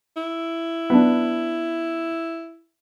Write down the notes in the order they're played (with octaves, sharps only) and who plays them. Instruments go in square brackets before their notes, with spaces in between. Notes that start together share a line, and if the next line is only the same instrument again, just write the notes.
[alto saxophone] E4
[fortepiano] B3 D4